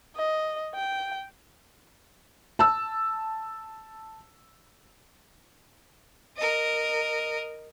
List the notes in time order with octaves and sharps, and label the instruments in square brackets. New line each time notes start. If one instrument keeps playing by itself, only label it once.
[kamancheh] D#5
G5
[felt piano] A5 E6
[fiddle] A#4 D#5